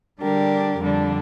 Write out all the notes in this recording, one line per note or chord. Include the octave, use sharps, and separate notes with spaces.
D3 G3 D4 G4 A#4
F2 D3 G3 D4